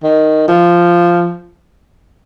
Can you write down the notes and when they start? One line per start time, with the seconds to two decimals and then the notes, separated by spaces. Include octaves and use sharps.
0.03 D#3
0.48 F3